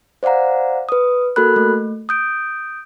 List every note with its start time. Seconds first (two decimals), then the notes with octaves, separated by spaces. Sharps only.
0.23 C5 D5 F5 F#5 A#5
0.89 B4 D#6
1.36 A#3 F#4 A4 A#4 B5 F#6
1.56 A3
2.09 D#6 G6 D7